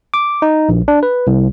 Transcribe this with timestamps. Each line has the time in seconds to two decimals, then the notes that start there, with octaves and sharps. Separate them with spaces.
0.14 D6
0.42 D#4
0.69 A#1
0.88 D4
1.03 B4
1.27 C2